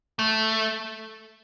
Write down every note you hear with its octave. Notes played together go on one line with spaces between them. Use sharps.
A3